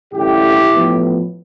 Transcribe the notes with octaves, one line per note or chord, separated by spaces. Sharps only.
A1 G2 D3 E4 G4
A1 A2 F3 B3